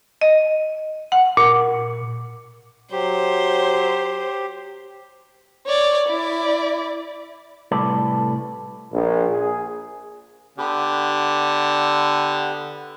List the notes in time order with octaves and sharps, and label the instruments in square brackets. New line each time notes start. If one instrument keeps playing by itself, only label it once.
[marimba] D#5
F#5
A#2
[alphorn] F#3 [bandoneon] G4 [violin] C5
[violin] C#5 D5
E4 D5
[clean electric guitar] C2 A2 G3 A4 B4 D5
[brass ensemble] A#1
G#4
[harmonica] D3 [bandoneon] B3 G4